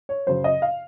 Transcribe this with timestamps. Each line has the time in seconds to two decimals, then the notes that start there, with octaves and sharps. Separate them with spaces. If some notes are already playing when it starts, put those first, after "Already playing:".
0.09 C#5
0.27 F#2 C#3 F#3 C5
0.44 D#5
0.62 F5